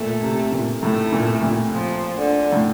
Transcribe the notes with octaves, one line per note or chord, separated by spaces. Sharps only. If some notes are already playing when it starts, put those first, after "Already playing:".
Already playing: A#2 A3
C3
A#2
A2 A3
A#2
A#2
F3
D3
A2